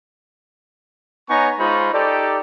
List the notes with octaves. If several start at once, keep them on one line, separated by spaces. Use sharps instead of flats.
B3 D#4 C#5 G#5 A#5 C#6
G#3 D#4 F4 C5 B5 C#6
D#4 G4 A4 D5